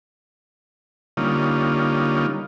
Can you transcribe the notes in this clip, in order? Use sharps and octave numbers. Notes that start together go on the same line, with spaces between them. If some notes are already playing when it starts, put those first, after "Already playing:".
D3 G3 A#3 C#4 D#4 F4